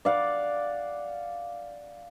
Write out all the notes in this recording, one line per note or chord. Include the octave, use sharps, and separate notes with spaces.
D5 F5 F#5